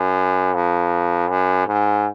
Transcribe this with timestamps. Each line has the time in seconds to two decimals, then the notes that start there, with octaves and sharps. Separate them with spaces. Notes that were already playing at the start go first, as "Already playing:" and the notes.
Already playing: F#2
0.54 F2
1.30 F#2
1.67 G#2